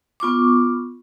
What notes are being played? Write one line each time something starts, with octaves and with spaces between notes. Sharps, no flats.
B3 F4 C#6 D6